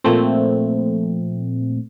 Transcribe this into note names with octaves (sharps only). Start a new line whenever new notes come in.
A#2 F3 A3 C4